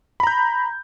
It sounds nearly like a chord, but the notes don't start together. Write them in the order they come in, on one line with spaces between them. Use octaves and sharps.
B5 A#5 G6